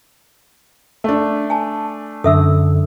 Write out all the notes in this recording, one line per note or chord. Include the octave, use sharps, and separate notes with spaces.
A3 D4
G#5 A5
F#2 D3 A4 E5 E6